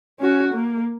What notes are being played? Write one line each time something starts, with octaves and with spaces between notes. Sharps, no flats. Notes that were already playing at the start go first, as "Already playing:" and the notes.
C#4 F#4
A#3